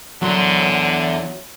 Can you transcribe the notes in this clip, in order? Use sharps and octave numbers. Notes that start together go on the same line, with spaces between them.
E2 D3 F#3 C6